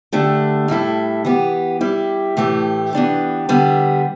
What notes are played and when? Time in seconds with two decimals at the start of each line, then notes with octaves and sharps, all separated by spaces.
0.12 D3 A3 D4 G4
0.68 A2 G3 E4 A4
1.25 E3 B3 G4
1.81 G3 E4 G4
2.37 A2 E3 A3 G4
2.93 E3 B3 D4 G4
3.49 D3 G3 B3